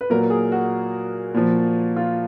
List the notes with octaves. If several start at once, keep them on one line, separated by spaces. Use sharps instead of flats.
B4
A#2 F#3 A#4
G#4
F#4
A#2 F3
F4